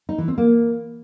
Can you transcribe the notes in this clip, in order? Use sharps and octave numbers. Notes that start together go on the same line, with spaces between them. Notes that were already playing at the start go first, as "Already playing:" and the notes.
D#4
E3
C4
A#3